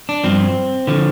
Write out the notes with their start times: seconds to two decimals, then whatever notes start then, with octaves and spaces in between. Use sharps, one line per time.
0.09 D4
0.24 G2 F3 C4
0.87 D3 F3